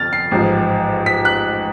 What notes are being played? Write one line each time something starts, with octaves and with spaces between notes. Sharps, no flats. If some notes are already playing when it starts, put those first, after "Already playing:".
Already playing: G1 F2 F6 A6
C7
A1 G#2 F3
B6
F#6